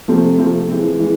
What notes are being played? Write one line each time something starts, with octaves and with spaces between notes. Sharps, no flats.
C3 F3 A3 C4
C3 F3 A3 C4
E3 G#3 C4
E3 G#3